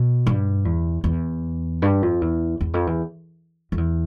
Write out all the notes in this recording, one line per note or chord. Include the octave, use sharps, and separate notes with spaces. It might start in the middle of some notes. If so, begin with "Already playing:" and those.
Already playing: B2
G2
E2
E2
G2
F2
E2
E2
F2
E2
F2
E2